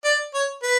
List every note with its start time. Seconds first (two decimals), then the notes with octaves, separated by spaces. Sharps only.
0.05 D5
0.35 C#5
0.63 B4